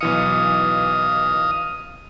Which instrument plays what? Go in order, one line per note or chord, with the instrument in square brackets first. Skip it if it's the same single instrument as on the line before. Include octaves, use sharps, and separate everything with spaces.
[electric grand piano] B1 E3 C#7 [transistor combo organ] D#5 F5 D#6